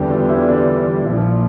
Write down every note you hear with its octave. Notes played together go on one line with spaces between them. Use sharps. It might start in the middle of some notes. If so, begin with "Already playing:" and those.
Already playing: E2 D3 G3 G4
F4
E4
D4
A#1 A#2 F3 E4